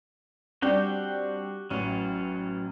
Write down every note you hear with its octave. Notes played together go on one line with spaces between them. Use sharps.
G3 C4 D4 F#4 G4 G5
A1 F#3 C#4